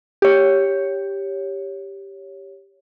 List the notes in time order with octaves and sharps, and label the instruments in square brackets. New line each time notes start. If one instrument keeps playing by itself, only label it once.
[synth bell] G4 C#5